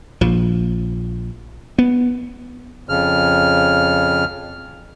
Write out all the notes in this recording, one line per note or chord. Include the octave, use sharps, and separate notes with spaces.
A#1 F3
B3
F2 C#3 F6